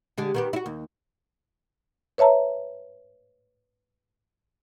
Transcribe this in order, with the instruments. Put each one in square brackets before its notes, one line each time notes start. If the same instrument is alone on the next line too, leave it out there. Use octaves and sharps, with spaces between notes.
[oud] D3 G#3 G4
D#3 B3 G4
E4 F#4
D#2
[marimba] B4 C#5 E5 A5 A#5